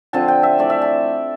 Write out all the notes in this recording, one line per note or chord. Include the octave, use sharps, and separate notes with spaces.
D3 F3 C4 A5
G5
E5
E3 A3 D4 D5
E5
A5